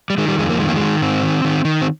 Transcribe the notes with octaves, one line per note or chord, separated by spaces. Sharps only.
G3
D#3 G#3
G3
F2 G#3
A#3
D#3 G#3
A#3
D#3 G#3
G#2 C4
D#3
D#3
D#3
C4